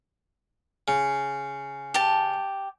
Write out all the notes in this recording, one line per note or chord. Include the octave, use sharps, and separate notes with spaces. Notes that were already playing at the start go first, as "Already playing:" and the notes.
C#3
G4 A5